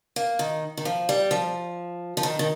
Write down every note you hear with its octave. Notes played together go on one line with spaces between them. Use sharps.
A#3
D#3
D#3
F3
G3
F3
F3
D#3
D#3